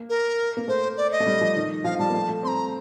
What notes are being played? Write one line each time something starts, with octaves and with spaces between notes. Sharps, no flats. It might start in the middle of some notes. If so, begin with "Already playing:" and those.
Already playing: A#3
A#4
A#3
A3 C5
D5
D#5
A3
G3
F3
D#3
F3 F5
G3 A5
A#3
A3
A3
C4 A#5 C6